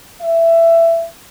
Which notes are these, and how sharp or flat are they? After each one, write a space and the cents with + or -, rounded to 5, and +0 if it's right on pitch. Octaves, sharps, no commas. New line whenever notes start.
E5 +15